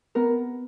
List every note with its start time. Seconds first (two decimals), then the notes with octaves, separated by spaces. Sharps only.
0.15 B3 A#4